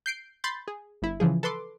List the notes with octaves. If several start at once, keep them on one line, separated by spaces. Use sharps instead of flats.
G6 C7 D7
B5 C6 G6 A6
G#4
G1 E4
C#3 E3 F3 G#4
A4 B4 C6 D6